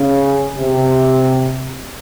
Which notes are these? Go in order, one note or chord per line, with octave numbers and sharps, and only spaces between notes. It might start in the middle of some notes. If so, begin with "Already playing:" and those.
Already playing: C#3
C3